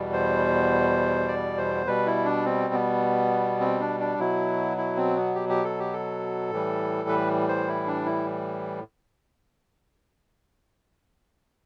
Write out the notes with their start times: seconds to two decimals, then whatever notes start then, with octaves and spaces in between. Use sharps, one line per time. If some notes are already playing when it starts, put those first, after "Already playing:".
Already playing: E2 B2 G3
0.13 C5
1.28 D5
1.58 C5
1.87 B2 G3 B4
2.06 E4
2.25 D4
2.45 C4
2.74 B3
3.60 C4
3.80 D4
4.00 D4
4.19 B2 F#3 E4
4.77 E4
4.97 C4
5.16 B3
5.35 G4
5.49 G4
5.64 A4
5.79 G4
5.93 A4
6.51 A2 E3 G3
7.09 B4
7.48 C5
7.68 E4
7.87 D4
8.06 E4